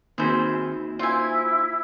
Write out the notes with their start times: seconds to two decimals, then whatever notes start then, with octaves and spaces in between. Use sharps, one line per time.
0.18 D#3 A#3 C4 D#4 E4 F#4 G#4 C5
0.99 E4 F4 C5 G#5